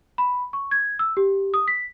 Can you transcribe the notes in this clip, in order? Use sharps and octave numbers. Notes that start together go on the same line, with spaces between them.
B5
C#6
G#6
E6
G4
D#6
B6